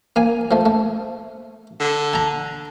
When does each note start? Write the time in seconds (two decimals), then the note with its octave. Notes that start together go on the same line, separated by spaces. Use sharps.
0.16 A#3 G#5
0.51 F3 A3
0.66 A3
1.80 D3
2.13 A5 A#5